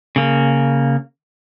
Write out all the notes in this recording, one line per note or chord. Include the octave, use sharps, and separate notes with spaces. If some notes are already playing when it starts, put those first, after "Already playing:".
C#3 A#3